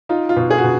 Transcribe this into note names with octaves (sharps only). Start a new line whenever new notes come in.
D#4 F4
F4
B2
G#4
F#4
B2